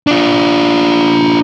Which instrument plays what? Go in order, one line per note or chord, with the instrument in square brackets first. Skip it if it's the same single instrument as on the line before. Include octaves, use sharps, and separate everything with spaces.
[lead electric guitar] D4 F4